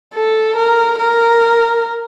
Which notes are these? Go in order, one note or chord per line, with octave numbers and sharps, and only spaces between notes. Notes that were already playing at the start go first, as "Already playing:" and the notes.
A4
A#4
A#4